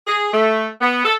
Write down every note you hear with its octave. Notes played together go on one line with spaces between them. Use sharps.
G#4
A3
B3
A4